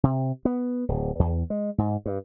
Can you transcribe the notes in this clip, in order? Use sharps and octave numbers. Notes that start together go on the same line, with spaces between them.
C3
B3
D1
E2
G#3
G#2
G2